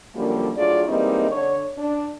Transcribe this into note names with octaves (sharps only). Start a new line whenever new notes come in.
F#2 D3 F3 G3 A#3
A2 F#3 D4 F4 G#4 D5
E3 G3 G#3 A#3 C4 D#4
D3 C#5
D4